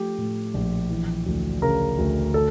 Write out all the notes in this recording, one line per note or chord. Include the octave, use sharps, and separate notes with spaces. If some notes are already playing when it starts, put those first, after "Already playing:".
Already playing: F3 A3 G4
A2
A#1
E3
D2
C#3 A#4
D2
D3 A4